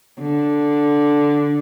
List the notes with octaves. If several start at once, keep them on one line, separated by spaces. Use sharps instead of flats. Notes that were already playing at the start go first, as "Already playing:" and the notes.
D3